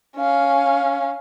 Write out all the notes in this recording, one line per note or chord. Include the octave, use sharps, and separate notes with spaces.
C#4 F5